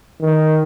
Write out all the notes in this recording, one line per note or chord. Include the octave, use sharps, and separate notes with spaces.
D#3